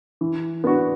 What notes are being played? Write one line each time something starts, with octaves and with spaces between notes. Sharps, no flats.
E3
B3 D4 F#4